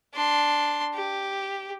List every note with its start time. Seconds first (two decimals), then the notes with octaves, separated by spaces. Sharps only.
0.14 D4 C6
0.94 G4